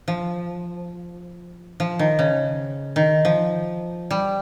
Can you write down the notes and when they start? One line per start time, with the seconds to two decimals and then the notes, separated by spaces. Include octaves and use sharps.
0.08 F3
1.80 F3
1.99 D#3
2.19 C#3
2.96 D#3
3.25 F3
4.11 G3